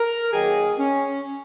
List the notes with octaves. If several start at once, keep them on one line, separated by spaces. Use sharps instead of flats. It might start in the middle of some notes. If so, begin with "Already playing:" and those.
Already playing: A#4
D#3 F#3 A#3 G#4
C#4